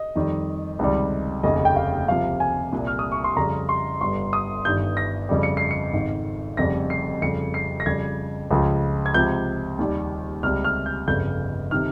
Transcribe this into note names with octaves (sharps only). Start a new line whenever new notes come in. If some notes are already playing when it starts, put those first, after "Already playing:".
Already playing: D#5
F2 D#3 G3
C#2 C3 D#3 G3
F1 D#2 C#3 D#5
G5
F5
C2 C3 F3 F5
G#5
C2 A#2 G3
F6
D#6
C#6
C6
F2 C#3 G3 A#5
C6
G1 G2 G3 C6
D#6
G1 G2 D#3 G6
A#6
F2 C#3 G3
C#7
C7
C#7
G#1 G#2 D#3
F1 F2 C#3 G3 A#6
C7
F2 C#3 G3 C#7
C7
A#6
F2 C#3 G3 G#6
C#2 C#3 F3
G#6
C#2 C3 F3 G6
D#2 D#3 G3
C#2 C3 G3 F6
F6
G6
G1 F2 C#3 G3 G6
C3 D#3 F6